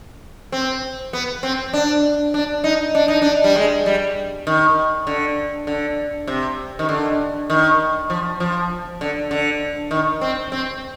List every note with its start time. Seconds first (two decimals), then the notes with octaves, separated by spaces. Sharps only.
0.52 C4
1.13 B3
1.43 C4
1.73 D4
2.34 D4
2.64 D#4
2.95 D4
3.08 D#4
3.22 D4
3.44 G3
3.56 G#3
3.86 G3
4.47 D#3
5.07 D3
5.67 D3
6.27 C3
6.79 D#3
6.89 D3
7.50 D#3
8.10 F3
8.40 F3
9.01 D3
9.31 D3
9.91 D#3
10.21 C4
10.52 C4